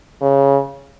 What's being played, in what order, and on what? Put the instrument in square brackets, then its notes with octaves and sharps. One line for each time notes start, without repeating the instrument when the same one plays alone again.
[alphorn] C#3